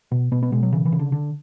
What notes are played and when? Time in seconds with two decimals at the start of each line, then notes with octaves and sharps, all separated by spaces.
0.12 B2
0.32 B2 B3
0.43 B3
0.52 B2 G#3
0.63 F#3
0.72 C#3 E3
0.85 E3
0.92 C#3
0.99 D3
1.12 D3